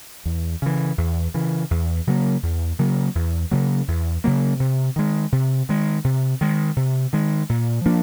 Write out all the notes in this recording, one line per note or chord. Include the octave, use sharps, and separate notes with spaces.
E2
C#3 E3
E2
C#3 E3
E2
C#3 F#3 A#3
E2
C#3 F#3 A#3
E2
C#3 F#3 A#3
E2
C#3 F#3 A#3
C3
D#3 G#3
C3
D#3 G#3
C3
D#3 G#3
C3
D#3 G#3
A#2
F3 A#3 D4